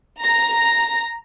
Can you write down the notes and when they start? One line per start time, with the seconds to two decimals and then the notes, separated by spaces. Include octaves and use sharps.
0.21 A#5 A#6